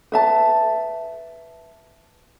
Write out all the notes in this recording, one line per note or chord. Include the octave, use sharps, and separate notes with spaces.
B4 E5 A5